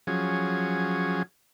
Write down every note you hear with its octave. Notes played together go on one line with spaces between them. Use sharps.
F3 F#3 C#4 G#4